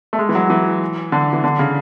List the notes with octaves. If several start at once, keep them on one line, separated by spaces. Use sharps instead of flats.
A3
G#3
E3
F#3
E3
D3
E3
D3
C#3